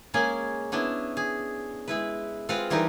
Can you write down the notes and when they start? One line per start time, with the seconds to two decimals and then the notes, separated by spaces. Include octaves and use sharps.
0.14 G#3 A#3 C#4 G#4 G#5
0.72 B3 C#4 D4 E4
1.17 G#4
1.88 G#3 E4 B4
2.49 G#3 C4 F4 B4 F5 F#5
2.70 E3 G3 C4 D#4 A#4 B4